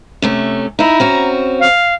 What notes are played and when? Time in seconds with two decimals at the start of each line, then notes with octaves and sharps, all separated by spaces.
0.22 C3 A3 C#4
0.79 D#4 E4 A#5
1.00 C4 C#4 F#4
1.60 F5